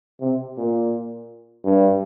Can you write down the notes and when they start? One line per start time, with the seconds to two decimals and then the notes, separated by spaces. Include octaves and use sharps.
0.21 C3
0.57 A#2
1.64 G2